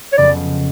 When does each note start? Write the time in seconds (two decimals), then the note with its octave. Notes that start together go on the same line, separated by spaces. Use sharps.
0.13 C#5
0.17 F2 C#3 F#3 B3 D5